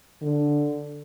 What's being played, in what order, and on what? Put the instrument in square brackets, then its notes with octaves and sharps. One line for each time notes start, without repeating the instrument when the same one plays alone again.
[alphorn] D3